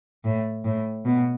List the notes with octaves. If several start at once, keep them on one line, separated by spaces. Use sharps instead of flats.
A2
A2
B2